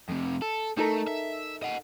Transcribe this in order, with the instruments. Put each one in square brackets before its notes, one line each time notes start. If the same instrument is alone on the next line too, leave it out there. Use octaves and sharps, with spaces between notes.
[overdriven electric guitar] F2 C3
A4
[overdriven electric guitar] A3 [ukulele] D#4 A4 A#4
[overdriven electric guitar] E5
D#5 F#5